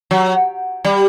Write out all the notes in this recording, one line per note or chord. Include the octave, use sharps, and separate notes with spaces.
F#3
G3